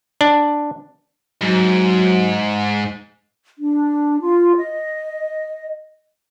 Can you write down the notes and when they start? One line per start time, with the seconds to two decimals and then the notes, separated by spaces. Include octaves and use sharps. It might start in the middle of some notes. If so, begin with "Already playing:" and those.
0.21 D4
1.42 G#2 F#3
3.59 D4
4.21 F4
4.56 D#5